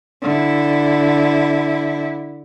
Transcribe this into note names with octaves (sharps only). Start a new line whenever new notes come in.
D3 E4